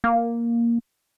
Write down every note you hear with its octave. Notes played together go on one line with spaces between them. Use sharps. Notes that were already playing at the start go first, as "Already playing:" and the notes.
A#3